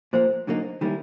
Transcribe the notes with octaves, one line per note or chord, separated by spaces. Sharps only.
A#2 F3 A#3 C5
F#2 D3 F#3 A#3 D#4
D#3 G3 A#3 C#4 E4